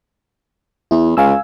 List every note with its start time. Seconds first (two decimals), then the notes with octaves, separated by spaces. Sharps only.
0.91 E2 E4
1.17 C#2 F5 G#5 E6